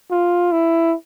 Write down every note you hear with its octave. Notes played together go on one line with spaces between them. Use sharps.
F4
E4